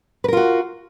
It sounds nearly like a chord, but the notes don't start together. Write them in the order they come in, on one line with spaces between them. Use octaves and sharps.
B4 A#4 F4 F#4